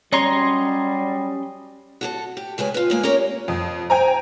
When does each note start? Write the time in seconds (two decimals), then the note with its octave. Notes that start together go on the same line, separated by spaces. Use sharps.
0.12 F#3 G3 C#4 C#5 D#5 A#5 C6
2.01 F#4 G4 A4
2.37 G4
2.58 C#3 G#3 B4 G#5
2.74 F4 B4
2.90 G#3 A#3 G#5
3.03 C#4 G4 A#4 C#5 D5
3.48 F2
3.90 C5 G5 G#5 A#5